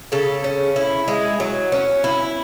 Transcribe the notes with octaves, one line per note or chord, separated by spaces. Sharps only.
C#3 A4
C#4
E4
G#3
F#3
C#4
E4